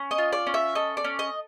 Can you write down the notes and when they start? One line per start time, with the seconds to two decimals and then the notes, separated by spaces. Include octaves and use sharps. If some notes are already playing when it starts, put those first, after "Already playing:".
Already playing: C#4
0.11 D#5
0.18 F4
0.33 D5
0.47 C#4
0.54 E5
0.75 A4 D#5
0.97 D5
1.04 C#4
1.19 D#5